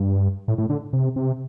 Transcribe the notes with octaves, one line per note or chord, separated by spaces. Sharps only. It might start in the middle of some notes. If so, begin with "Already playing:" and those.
Already playing: G2
A2
A2
D3
C3
C3